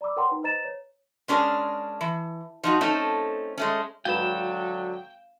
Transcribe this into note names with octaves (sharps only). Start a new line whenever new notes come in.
D5 A#5 B5 D6 E6
A#4 C#5 F#5 G5 A#5 C6
D#4 B4
B4 C5 D#5 A#5 A6 E7
C#5
G#3 C#4 D4 G#4 A#4
E3
F3 D#4 F#4
A3 C4 C#4 D#4 A4
G#3 A3 C#4
G#1 D3 F#3 B4 F5 G5 E7